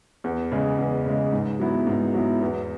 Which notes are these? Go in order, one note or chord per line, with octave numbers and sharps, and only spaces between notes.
E2
C#3 G#3
E2
C#3 G#3
G#2
F#3 B3 E4
G#2
F#3 B3 E4
E2